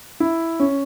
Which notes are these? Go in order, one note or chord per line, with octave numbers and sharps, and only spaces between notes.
E4
C#4